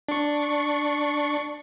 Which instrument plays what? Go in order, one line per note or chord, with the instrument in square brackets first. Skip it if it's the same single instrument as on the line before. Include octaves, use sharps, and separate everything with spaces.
[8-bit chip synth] D4 C#6